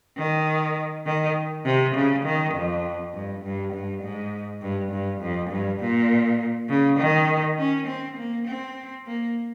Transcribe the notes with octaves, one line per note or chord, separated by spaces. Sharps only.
D#3
D#3
C3
C#3
D#3
F2
G2
G2
G2
G#2
G2
G2
F2
G2
A#2
C#3
D#3
C#4
C4
A#3
C4
A#3